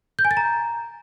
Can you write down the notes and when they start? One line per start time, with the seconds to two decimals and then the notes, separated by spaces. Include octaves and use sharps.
0.19 G6
0.25 G#5
0.31 A6
0.37 A#5